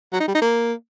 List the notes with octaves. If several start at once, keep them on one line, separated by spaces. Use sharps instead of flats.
F#3
D#4
G3
D#4
A#3